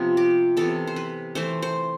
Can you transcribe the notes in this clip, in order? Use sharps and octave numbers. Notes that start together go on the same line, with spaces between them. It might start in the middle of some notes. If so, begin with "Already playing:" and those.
Already playing: C3 F3 B3 F4
G4
C3 E3 B3 A4
C5
B4
E3 A3 C5
C5